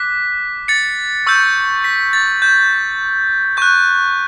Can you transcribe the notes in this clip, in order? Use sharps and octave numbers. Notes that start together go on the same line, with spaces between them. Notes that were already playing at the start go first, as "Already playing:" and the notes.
Already playing: D6 F#6 B6
A6 C#7
C#6 E6 G6
B6
A6
G6
C#6 F#6 G6